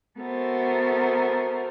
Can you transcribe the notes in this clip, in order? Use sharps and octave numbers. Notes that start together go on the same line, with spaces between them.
B3 F#4 A4 A#4 C5 E5